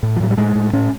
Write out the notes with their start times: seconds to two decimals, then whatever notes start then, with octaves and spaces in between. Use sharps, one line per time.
0.03 A2
0.16 F3
0.20 A2 F#3
0.30 G3
0.38 A2 G#3
0.55 A2
0.73 A2 C#4